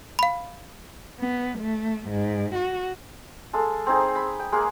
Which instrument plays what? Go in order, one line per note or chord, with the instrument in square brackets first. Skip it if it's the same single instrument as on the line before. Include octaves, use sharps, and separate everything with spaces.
[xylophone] F5 B5
[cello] B3
A3
G#2
F#4
[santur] G#3 A4 F5
C4 D#4 G#4
B5
G5
G#3 A#3 G#4